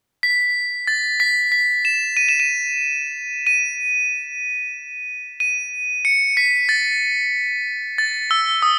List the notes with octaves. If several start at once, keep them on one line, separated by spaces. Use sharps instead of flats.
B6
A6
B6
B6
E7
D#7
E7
D#7
D#7
D#7
C#7
B6
A6
A6
E6
D#6